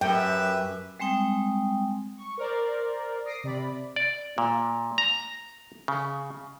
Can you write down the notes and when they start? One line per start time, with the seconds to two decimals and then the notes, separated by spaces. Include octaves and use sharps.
0.01 F#2 G4 B4 E5 G5
1.00 G3 G#3 C4 G5 D#6
2.17 C#6
2.38 A#4 C5 D5
3.25 D#6 A#6 C7 D7
3.44 C3 D5 B5
3.96 D5
4.38 A#2
4.98 A#5
5.88 C#3